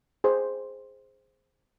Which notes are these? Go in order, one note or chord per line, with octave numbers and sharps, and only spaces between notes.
G#4 C5